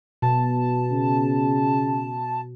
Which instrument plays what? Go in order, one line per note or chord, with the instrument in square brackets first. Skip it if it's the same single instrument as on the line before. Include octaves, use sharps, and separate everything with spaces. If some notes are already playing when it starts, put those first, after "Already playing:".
[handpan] B2 [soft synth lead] A5
[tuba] C#3